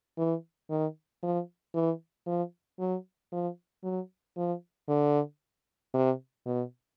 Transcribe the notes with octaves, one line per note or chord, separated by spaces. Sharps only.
E3
D#3
F3
E3
F3
F#3
F3
F#3
F3
D3
C3
B2